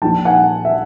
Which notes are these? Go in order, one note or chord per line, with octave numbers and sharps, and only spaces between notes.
A#1 A#2 F3 G5 A5
F#5 G#5
E5